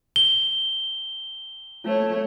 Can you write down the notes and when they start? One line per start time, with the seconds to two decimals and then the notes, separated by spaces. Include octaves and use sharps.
0.16 G7
1.84 A3 C#5